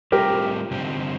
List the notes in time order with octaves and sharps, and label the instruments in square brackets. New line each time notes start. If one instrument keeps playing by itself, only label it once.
[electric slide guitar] A2 G3 C4 F4 [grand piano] G4 A#4
[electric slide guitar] G2 D3 G3 C4